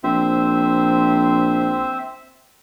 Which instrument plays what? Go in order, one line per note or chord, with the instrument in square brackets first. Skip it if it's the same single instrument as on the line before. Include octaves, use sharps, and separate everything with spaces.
[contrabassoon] A#1 [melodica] C4 C5 E5